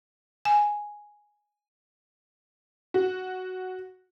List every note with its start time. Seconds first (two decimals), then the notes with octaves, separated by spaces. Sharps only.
0.45 G#5
2.94 F#4